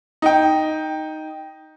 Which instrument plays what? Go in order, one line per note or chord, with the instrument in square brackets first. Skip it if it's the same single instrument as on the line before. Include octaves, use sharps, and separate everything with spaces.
[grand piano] D#4 G5